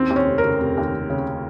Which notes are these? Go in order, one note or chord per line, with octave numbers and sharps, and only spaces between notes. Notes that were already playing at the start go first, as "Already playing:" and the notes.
Already playing: D#2 C4
D#2
C#4
F1
A#4
C#3
F1
D#2
F1
C#3